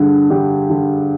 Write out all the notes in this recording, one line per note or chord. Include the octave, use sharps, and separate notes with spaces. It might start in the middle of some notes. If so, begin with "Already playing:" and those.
Already playing: G2 D3 G#4
D3 G4
D3